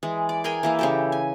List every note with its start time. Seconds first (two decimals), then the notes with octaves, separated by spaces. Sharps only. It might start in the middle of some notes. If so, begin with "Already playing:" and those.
0.03 E3 G#3
0.29 D5
0.44 G#4 A#4 G5 G#5
0.63 E3 A#3 E4
0.79 C#3 G4 A4
1.12 G#5